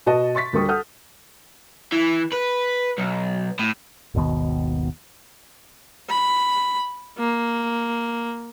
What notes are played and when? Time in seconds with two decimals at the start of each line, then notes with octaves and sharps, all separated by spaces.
0.06 B2 F#4 D#5 A5
0.35 C6 C#6 A6 B6
0.53 D2 G3 A#4 C#6 D#6
0.68 A4 F#5 D#6 F6 G6
1.92 E3
2.32 B4
2.98 B1
3.59 A2
4.14 G#1 D#2 B2 D#3
6.10 B5
7.18 A#3